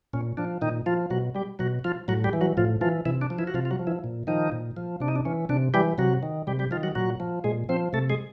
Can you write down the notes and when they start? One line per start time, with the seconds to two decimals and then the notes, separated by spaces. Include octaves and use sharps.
0.13 A#2 C#4
0.37 F3 D4
0.61 A#2 D#3 D#4
0.86 F3 F4
1.10 B2 F#3 F#4
1.35 G3 G4
1.59 B2 F#3 F#4
1.84 F3 F4
2.08 A2 F#3 F#4
2.24 G3 G4
2.33 E3
2.41 F#3 F#4
2.57 A2 F3 F4
2.81 E3 F3 F4
3.05 C3 E3 E4
3.21 D4
3.30 F3
3.38 E3 E4
3.47 F#4
3.54 C3 F3 F4
3.65 F4
3.71 F#3 F#4
3.79 F3
3.87 E3 E4
4.04 A#2
4.27 D#3 F3 D#4
4.52 A#2
4.77 F3
5.00 C3 D4
5.08 D#4
5.16 D4
5.25 E3 C#4
5.49 C3 D4
5.74 E3 G3 G4
5.98 C3 F#3 F#4
6.23 D#3
6.47 C3 G3 G4
6.59 G3 G4
6.71 D#3 F3 F4
6.83 F#3 F#4
6.95 A#2 F#3 F#4
7.20 F3
7.44 A#2 G#3 G#4
7.69 F3 C4 C5
7.93 C3 A3 A4
8.10 G#3 G#4